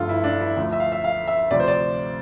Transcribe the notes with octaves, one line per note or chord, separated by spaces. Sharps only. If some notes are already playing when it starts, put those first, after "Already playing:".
Already playing: G1 G2 D3 F3 A3 F4 A4
E4
D4
E4
D2 D3 F3 A3
E5
F5
E5
F5
E5
D2 C3 F3 D5
C5
D5